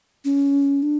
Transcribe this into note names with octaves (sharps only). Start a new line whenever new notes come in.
C#4
D4